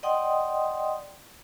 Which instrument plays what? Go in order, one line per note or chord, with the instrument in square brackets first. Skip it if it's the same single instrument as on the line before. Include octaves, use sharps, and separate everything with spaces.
[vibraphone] D5 D#5 F#5 G5 C6 D#6